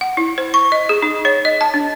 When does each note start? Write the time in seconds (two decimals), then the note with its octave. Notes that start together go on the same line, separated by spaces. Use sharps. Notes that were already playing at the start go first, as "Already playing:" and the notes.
0.01 F#5
0.17 E4
0.38 C5
0.54 C#6
0.72 D#5
0.89 G#4
1.02 D#4
1.25 C#5
1.45 D#5
1.61 A5
1.74 D4